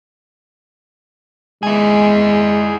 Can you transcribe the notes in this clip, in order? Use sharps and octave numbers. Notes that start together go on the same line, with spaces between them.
G#3 E4 G#4